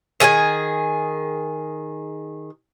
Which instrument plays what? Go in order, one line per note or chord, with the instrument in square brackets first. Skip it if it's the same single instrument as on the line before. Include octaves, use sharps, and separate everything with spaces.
[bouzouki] D#3 G#4 C#5 G#5